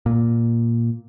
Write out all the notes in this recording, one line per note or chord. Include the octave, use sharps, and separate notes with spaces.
A#2